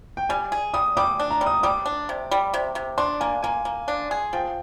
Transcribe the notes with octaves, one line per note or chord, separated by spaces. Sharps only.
G5
G3 G#5
G#4
G3 D#6
G3 D6
D4
A#5
G3
D#6
G3 D6
D4
C3
G3
C3
C3
D4 C6
A#3 G#5
A#3 G#5
A#3
D4
G#4
F3 G5